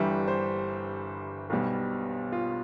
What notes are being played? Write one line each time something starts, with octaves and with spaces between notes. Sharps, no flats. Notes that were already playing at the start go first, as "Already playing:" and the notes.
Already playing: G1 G2 E3 G3 E5
C5
B1 B2 G3
F4